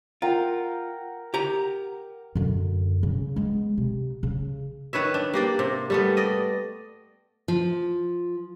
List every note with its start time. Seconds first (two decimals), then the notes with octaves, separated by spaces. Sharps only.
0.22 F4 A#4 F#5 G5
1.34 G4 A#5
2.35 F#2 D3
3.03 C#3
3.36 G#3 B3
3.78 C3
4.23 C#3
4.93 D#3 B4 C#5 E5
5.14 D4
5.33 A#3 G4 D5
5.59 C3
5.90 G3 A3 B3
6.17 D5 D#5
7.48 F3